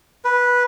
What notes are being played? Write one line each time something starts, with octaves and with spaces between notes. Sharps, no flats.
B4